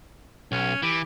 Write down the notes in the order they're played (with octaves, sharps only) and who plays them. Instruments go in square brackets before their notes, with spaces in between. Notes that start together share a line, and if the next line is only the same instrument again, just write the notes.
[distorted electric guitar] B1 [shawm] C#4
[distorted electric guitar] E3 [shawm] G4